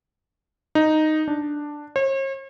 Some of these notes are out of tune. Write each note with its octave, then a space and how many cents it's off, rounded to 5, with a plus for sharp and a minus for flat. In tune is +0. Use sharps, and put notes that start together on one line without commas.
D#4 -5
D4 +5
C#5 -45